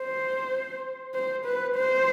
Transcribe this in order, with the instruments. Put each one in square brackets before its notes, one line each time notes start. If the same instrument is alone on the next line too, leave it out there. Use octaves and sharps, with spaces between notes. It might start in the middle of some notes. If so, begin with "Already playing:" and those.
Already playing: [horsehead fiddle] C5
C5
B4
C5